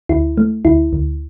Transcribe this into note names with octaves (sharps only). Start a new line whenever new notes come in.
D2 E4
A3
D2 E4
D2